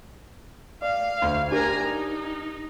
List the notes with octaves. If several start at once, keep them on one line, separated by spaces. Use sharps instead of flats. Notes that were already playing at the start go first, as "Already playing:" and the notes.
D5 F5
D2
D4 G4 A#4 G#5 A#5
D#4